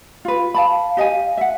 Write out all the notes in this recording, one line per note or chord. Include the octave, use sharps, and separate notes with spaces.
F4 B4
F5 A5 B5
G4 D#5 F5 G#5
E5 F#5